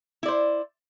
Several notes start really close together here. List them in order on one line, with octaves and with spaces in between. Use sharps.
E4 D5 C5